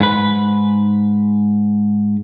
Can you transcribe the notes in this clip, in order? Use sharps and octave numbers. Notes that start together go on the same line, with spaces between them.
G#2 B4